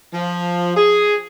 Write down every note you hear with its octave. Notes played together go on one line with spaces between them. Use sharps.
F3
G#4